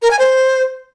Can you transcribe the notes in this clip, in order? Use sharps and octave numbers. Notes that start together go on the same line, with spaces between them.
A#4
G#5
C5